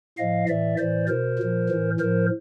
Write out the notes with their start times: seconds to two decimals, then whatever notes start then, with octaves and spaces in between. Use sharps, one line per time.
0.18 A2 F3 D#5 F5
0.48 A2 E3 D5 E5
0.78 A2 E3 C5 D5
1.08 B2 A#4 C5
1.39 A#2 F3
1.69 A2 E3
2.00 A2 F3 A#4 C5